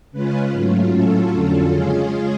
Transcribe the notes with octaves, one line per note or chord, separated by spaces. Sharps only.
C#3 G#3 C#4 F4 B4
G#2 F#3 A3 C#4 F4
A2 F#3 C#4 F4 A4
F2 D3 F#3 C#4 F4 A4
C#3 G#3 C#4 F4 G#4